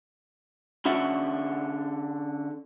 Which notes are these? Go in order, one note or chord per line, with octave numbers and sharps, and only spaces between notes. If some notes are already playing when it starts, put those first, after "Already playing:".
D3 C#4 E5 F#5